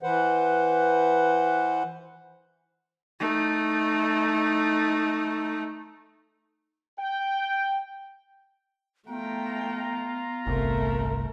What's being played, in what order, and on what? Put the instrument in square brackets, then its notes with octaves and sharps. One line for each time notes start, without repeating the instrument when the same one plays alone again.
[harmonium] E3 B4 C5 F#5
[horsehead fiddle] A3 D#4
[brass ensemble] G5
[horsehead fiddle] A3 G5 [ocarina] B3 [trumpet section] F4 F5 A#5
[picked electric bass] G1 C2 [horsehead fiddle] A3 A#4